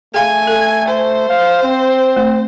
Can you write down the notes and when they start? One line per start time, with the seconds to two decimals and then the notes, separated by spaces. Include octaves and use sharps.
0.14 A3 G#4 F5 G#5
0.47 A4
0.89 C5
1.30 F5
1.63 C4
2.16 A3